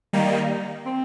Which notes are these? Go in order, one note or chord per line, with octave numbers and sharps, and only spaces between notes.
D#3 G3 A#3 D#4
C4